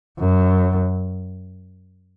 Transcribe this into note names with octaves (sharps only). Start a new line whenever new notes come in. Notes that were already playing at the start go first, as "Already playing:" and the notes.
F#2